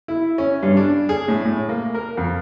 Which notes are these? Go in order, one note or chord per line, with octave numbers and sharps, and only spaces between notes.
E4
C#4
G2
D4
G#4
A2
A2
A#3
A#4
F2